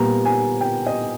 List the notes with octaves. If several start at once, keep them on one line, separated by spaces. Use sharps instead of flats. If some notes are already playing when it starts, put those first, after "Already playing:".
Already playing: A#2 G3 B3 A#5
G#5
G5
D#5